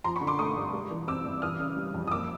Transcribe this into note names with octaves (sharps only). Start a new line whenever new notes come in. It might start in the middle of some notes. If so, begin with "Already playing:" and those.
F3 A#5 C6
B5 C#6
D3
C6 D6
A3 C#6 D#6
G2
G#3
E3
C4 D6 E6
G2
E3 D#6 F6
C#3
G3
F2
D#6
A#3 D6 E6